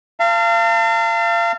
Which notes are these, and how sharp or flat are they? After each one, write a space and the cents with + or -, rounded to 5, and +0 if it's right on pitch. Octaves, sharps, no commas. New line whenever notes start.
F5 -30 A5 +40